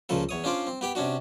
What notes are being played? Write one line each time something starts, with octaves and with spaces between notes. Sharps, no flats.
C#2 A#2 C#3 F3 A4
E2 C#5 D#6
C#4 D4 F4 C5 D5
C4
B3 G4 G5
C3 C#4 D4 F#4